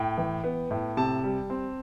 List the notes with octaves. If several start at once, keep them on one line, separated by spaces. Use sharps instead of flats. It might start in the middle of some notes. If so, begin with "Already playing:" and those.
Already playing: A2 G5
E3
B3
A2
C3 A5
G3
C4